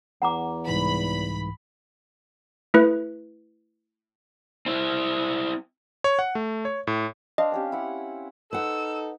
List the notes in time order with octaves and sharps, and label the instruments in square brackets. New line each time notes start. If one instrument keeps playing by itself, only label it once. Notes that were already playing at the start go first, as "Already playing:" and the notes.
[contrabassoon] E2 [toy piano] F#5 A#5 D6
[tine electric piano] C2 G#2 E3 [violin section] B5
[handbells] A3 E4 B4
[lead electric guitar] C4 E4
[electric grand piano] C#5
F#5
A3
C#5
A2
[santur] D4 C5 F5 [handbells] D#5
[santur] C4 C#4 G4
E4 F#5
[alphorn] D#4 [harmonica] A4 [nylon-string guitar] B4 C5 F#5 [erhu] E6